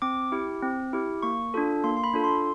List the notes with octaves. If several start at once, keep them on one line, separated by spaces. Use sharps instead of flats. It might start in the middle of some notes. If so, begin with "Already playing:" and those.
C4 D6
E4 G4
C4
E4 G4
A#3 C#6
D4 F4 A4
A#3 C6
C6
B5
D4 F4 A4
C6